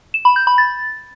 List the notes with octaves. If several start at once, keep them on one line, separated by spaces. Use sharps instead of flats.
E7
B5
G6
B5
A6